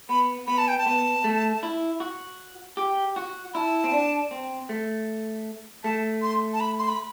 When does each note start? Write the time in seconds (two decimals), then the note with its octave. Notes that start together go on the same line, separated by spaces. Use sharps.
0.09 B3 B5
0.47 B3 B5
0.58 A5
0.68 G5
0.78 A5
0.86 B3
1.24 A3
1.63 E4
2.00 F#4
2.77 G4
3.16 F#4
3.54 E4 A5 B5
3.84 C4
3.92 D4
4.31 C4
4.69 A3
5.84 A3 A5
6.22 C6
6.53 A5
6.60 B5
6.79 C6
6.89 B5